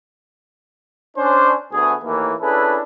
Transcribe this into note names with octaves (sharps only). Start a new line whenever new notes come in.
C#4 D4 C5
D2 A3 B3 G#4
D#2 A2 E3 A#3
C#4 D4 E4 G#4 A4 B4